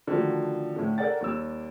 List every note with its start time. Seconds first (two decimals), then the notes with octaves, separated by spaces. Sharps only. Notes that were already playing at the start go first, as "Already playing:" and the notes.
0.07 D3 D#3 F3 A3 F#4
0.76 A2 D3
0.98 A4 A#4 D5 F#5 G5 A6
1.21 D#2 G3 E6